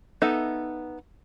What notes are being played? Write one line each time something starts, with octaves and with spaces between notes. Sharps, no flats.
B3 D#4 A4 E5